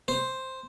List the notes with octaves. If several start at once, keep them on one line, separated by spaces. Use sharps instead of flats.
C5